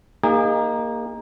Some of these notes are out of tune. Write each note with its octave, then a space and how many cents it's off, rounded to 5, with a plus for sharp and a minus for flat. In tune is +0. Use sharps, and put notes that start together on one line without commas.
A#3 -5 D#4 +5 G#4 -40